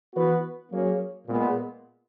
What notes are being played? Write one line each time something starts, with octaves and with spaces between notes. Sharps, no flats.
E3 B3 F#4 B4
F#3 A#3 C#4 G#4 C#5
A#2 G#3 B3